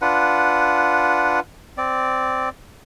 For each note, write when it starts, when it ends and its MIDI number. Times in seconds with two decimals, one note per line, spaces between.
0.02 1.40 62
0.02 1.40 65
0.02 1.40 71
0.02 1.40 78
1.78 2.49 60
1.78 2.49 74